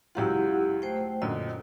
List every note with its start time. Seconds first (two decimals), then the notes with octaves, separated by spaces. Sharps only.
0.15 C#2 F#3 E4 F4 G4 F#5
0.82 A3 C5 G5
1.22 F#2 A#2 D3 D#5